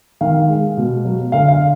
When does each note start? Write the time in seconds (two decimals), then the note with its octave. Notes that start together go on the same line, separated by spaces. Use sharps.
0.21 D#3 F5
0.48 G#3
0.77 B2
1.05 F#3
1.32 D3 F5
1.48 F5